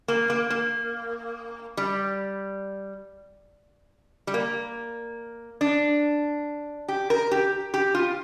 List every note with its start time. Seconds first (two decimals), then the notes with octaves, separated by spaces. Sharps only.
0.08 A#3
0.30 A#3
0.50 A#3
1.77 G3
4.27 G3
4.34 A#3
5.61 D4
6.88 G4
7.10 A#4
7.31 G4
7.74 G4
7.95 F4